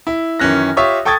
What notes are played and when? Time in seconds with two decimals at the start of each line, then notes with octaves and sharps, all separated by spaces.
0.07 E4
0.40 F#2 D#3 E3 C#4 F#6 A#6
0.77 F4 G4 C#5 E5 C#6 D#6
1.05 A4 G5 C#6 D#6 G#6 A6